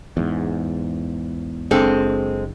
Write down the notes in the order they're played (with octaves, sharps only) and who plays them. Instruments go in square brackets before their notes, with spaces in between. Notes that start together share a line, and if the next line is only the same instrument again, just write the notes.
[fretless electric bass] E2 G#2
[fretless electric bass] F#1 D4 [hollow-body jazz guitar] G#3 C4 A4